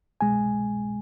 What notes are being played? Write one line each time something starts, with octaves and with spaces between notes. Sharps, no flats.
C2 B2 G#3 G#5